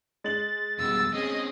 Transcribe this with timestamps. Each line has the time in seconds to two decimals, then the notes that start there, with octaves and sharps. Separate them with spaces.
0.24 G#3 A6 F#7
0.79 F2 B2 G3 E6
1.14 C4 C#4 G#4 D#5